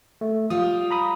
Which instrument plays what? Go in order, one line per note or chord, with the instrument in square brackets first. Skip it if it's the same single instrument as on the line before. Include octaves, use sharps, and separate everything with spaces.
[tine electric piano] A3
[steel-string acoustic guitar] G3 F4 [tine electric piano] D#6
[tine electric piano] A#5 B5 D#6